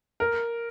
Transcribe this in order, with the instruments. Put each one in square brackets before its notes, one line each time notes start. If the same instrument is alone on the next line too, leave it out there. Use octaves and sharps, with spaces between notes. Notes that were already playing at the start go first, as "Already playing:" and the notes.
[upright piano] A#4